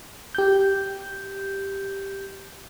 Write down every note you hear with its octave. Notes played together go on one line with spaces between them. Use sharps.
G4 G6